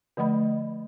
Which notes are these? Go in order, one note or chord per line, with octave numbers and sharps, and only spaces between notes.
D3 F3 A3 D#5 B5